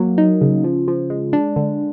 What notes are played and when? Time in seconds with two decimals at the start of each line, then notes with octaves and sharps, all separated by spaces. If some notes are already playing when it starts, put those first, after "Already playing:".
Already playing: F#3 A#3
0.18 D#4
0.41 C#3
0.64 F3
0.88 F3
1.10 G#3
1.33 D4
1.56 D3